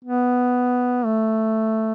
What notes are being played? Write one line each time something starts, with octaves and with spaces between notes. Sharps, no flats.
B3
A3